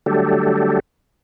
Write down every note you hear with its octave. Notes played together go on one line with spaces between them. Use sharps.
D3 F#3 G3 A3 G4 A4